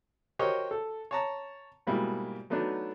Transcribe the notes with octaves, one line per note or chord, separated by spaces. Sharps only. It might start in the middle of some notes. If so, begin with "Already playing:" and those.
F#4 G4 A#4 C5 C#5 D#5
A4
C#5 A5 A#5
G#2 B2 G3 A#3 E4
F#3 A3 B3 D4 D#4